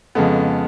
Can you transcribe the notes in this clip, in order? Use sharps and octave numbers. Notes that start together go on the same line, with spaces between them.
F2 C#3 G#3 B3 A4